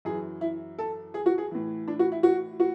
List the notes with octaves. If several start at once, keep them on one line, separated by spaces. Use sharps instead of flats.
F#2 E3 G#4
E4
A4
G#4
F#4
G#4
A2 E3
D4
F#4
E4
F#4
F#4